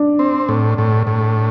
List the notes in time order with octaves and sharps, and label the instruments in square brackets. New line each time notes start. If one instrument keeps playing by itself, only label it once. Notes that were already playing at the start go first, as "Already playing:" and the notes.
Already playing: [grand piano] D4
[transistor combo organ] C4
A2
A2
A2